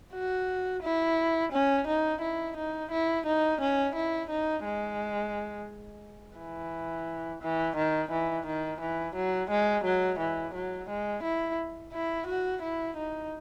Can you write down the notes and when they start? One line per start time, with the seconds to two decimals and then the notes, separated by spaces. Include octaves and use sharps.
0.14 F#4
0.83 E4
1.52 C#4
1.87 D#4
2.21 E4
2.57 D#4
2.91 E4
3.26 D#4
3.61 C#4
3.95 E4
4.30 D#4
4.65 G#3
6.38 E3
7.42 E3
7.76 D#3
8.11 E3
8.46 D#3
8.81 E3
9.16 F#3
9.50 G#3
9.84 F#3
10.19 E3
10.55 F#3
10.89 G#3
11.24 E4
11.93 E4
12.27 F#4
12.62 E4
12.97 D#4